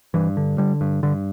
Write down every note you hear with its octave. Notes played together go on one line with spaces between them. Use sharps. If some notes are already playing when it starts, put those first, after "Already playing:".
G2 E3
D3
D3 G3
G2
G2 D3